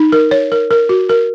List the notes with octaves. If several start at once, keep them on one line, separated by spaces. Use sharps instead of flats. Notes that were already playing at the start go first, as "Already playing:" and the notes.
Already playing: D#4
A#4
C#5
A#4
A#4
F#4
A#4